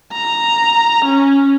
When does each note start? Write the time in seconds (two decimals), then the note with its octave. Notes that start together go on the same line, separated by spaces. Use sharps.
0.13 A#5
1.05 C#4